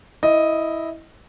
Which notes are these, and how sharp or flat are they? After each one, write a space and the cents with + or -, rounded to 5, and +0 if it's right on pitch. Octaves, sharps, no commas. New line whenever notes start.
E4 -10 D#5 +0